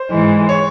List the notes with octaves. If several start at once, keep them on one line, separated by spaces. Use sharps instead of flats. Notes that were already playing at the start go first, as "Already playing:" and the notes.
Already playing: C5
G#2 E3 G#3
C#5